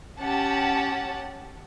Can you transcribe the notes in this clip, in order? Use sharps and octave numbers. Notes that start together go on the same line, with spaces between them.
C#4 G4 F#5 A5